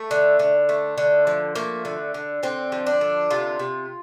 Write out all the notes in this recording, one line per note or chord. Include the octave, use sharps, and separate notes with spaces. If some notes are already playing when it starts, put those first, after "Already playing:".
Already playing: A3
D3
D3
A3
D3
F3
A3 A#3
D3
D3
D3 C4
F3
D4
D3
C3 F4
C3